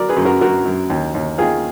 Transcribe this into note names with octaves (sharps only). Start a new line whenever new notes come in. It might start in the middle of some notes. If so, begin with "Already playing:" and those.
Already playing: F#3 A#4 D5
G#4 B4
F#2
F#4 A#4
F#2 F#4 A#4
F#2
D#2
D#2
D#3 F4 G#4